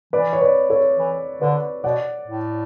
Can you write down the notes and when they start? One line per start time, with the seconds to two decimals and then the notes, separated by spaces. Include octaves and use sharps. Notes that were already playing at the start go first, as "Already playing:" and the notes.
0.13 E3 B4 D5
0.33 C#5
0.41 B4 D5
0.70 A4 C#5
0.98 E3
1.41 D3 B4 D5
1.84 B2 D5 F#5
2.27 A2